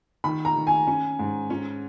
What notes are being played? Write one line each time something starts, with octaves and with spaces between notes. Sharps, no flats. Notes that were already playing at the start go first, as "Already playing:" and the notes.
D#3 B5
A#5
D#3
G#5
C#4
G#2
C#4